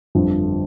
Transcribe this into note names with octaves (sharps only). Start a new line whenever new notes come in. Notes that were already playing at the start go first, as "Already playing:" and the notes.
G1 F2 D3 F3